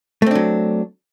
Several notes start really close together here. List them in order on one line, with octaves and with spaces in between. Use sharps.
A3 C4 D4 F#3